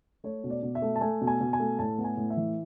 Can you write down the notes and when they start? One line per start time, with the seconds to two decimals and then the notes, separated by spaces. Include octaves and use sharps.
0.24 A3 C#5
0.44 B2
0.50 D5
0.63 B2
0.75 E5
0.82 A3
0.96 A5
1.01 A3 G#5
1.21 B2
1.27 G#5
1.40 B2
1.53 G#5
1.60 A3
1.79 A2 A5
1.98 B3
2.04 G#5
2.17 A2
2.30 E5
2.37 E3